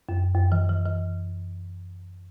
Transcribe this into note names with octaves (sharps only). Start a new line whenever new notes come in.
F#2
F#2
E3
E3
E3